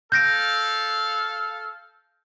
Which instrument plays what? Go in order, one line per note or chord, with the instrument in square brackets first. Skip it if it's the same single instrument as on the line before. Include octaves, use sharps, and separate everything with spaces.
[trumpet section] A4 F5 [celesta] G6 A#6 D7